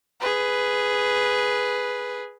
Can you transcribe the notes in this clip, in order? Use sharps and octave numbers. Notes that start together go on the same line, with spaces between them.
G#4 B4